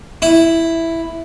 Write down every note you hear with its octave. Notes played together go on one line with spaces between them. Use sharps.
E4